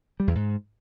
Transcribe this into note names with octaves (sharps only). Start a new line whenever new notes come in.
G3
E2
G#2